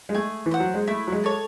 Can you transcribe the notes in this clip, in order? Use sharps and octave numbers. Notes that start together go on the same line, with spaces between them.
G#3
A3 G#4
E3
C5 F#5
F#3
G#3
A3 E4
F#3
G#3
A4 C#5